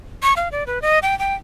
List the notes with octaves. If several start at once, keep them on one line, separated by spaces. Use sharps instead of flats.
C#6
F5
D5
B4
D#5
G5
G5